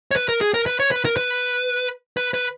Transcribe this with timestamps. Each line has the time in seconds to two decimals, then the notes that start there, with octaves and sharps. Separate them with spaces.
0.11 C#5
0.16 B4
0.29 A#4
0.41 G#4
0.54 A#4
0.66 B4
0.80 C#5
0.91 B4
1.05 A#4
1.17 B4
2.17 B4
2.34 B4